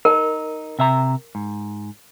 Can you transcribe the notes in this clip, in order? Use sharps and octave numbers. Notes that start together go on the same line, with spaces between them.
D#4 A#4
C3 E5 A#5
G#2